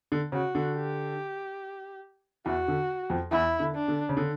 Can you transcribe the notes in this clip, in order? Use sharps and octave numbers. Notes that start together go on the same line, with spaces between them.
D3
C#3 F#4
D3
G4
E2 E3 F#4
D3
F2 F3
E2 E3 E4
D3
D4
D3
C#3
D3